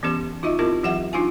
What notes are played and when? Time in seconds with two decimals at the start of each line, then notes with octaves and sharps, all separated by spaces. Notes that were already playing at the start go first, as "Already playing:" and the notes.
0.03 E3 B3 C#4 G4
0.43 D#4 F4 F#4 D#5 E5
0.59 C4 E4 F4 G4 A#4
0.83 E3 F#3 G4 E5 F#5
1.13 D4 D#4 F4 F#4 F5 G#5